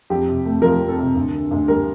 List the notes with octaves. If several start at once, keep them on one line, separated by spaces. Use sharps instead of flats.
F2 G4
C3
A3
F3 A#4
F2
A4
C3
D2
D3
D2
G3 A#4